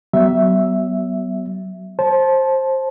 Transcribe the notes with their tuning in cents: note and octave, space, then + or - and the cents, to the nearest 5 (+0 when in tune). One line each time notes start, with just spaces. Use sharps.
F#3 +35 B3 +0 E5 +0
C5 +20 A5 -15